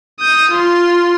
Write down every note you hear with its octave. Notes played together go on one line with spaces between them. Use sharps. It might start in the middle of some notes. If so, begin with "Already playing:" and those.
D#6 G6
F4 C6